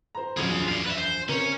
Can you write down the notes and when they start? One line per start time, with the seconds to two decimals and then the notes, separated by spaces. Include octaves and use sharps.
0.15 C5 A#5
0.37 E1 A#1 F#2 F4 G#4
0.68 D5 F5
0.85 B4 E5
0.97 C5
1.29 C3 C#4 A#4 F#7